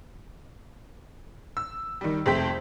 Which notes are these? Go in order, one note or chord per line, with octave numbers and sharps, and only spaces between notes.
E6
D#3 G3
F2 C3 A3 C5 G5 B6